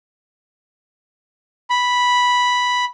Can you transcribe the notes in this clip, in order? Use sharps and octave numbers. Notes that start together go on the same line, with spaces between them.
B5